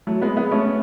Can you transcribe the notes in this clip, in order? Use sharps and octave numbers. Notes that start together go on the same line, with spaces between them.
F#3 A3
G#3 B3
G#3 B3
A3 C#4